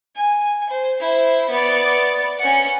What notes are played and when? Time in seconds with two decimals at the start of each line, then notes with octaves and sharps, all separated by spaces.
0.16 G#5
0.69 C5
0.99 E4 C5
1.50 B3 D5
2.38 C#4 F#5